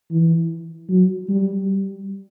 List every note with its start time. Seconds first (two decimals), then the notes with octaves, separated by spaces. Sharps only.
0.11 E3
0.89 F#3
1.29 G3